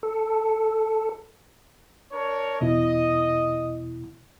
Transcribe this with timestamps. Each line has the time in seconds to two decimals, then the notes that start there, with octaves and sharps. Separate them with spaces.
0.03 A4
2.12 D4 A#4 C#5
2.61 E2 B2 E4 D#5